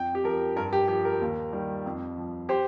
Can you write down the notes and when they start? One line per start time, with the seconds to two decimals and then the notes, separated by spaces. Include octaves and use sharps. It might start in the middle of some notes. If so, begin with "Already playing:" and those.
Already playing: F2 G5
0.15 G4
0.24 F3 A#4
0.56 G2 A#4
0.73 G4
0.88 F3 G4
1.05 A#4
1.21 D#2
1.53 D#3 G3
1.86 F2
2.17 F3
2.49 G4 C5